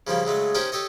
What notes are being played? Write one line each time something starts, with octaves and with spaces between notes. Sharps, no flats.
C#3 F3 G3 A#3
C#3 F#3 G#3 A3
C#4 D#4 G4 A#4 C5 C#5
G4 A4 C#5 D#5